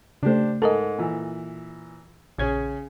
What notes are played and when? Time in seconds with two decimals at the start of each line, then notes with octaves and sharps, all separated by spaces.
0.23 C#3 A3 D4 G4 C5
0.62 G#2 A4 A#4 D#5
0.98 A#2 E3
2.38 A#1 C#3 C#4 G#4 G#6